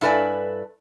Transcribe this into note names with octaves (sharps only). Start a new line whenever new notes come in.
G2 E4 A4 B4 D5 G#5